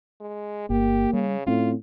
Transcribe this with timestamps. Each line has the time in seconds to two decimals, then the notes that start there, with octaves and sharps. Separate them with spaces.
0.21 G#3
0.70 G1 A#3 G4
1.13 C#3 G3
1.47 A2 C4 C#4 F4